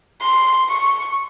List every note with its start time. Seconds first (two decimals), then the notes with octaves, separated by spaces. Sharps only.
0.21 C6
0.69 C#6